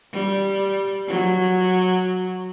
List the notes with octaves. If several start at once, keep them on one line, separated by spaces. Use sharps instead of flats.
G3
F#3